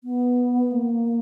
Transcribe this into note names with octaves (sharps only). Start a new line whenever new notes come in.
B3
A#3